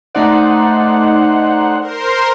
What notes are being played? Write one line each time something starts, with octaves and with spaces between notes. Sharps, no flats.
A3 D#4 C5 D5 F#5
A#4 C5 C6